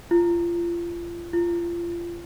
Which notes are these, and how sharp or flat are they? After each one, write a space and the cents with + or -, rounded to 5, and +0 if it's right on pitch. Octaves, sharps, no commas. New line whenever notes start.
F4 -30
F4 -30